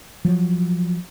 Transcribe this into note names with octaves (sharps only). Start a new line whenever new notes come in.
F3 F#3